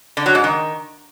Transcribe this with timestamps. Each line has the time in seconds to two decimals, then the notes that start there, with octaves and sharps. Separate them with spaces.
0.17 D3
0.26 F#3
0.35 G#2
0.44 D#3